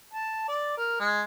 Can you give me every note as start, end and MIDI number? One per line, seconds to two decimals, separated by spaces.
0.14 0.45 81
0.48 0.77 74
0.78 0.97 70
1.00 1.23 56